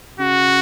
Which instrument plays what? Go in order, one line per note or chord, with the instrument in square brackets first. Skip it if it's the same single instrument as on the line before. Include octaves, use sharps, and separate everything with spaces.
[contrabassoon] C#3 [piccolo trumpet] F#4